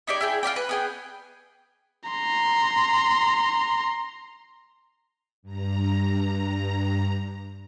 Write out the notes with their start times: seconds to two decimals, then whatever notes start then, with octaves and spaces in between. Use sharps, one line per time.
0.07 D#4 E4 G4 D5
0.21 E4 G#4 G5
0.43 F4 G4 D5 G5
0.56 B4
0.69 B3 G#4 G5
2.09 A#5 C6
5.43 G2 A#5